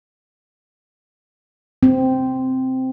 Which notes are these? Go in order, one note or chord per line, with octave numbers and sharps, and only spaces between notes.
C4